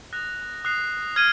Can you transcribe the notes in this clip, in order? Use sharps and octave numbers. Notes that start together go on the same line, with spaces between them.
D#6 F#6 A#6 F7
D#6 F#6 C7
F6 G#6 D#7